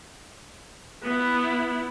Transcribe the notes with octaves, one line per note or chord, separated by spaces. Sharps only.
B3 E4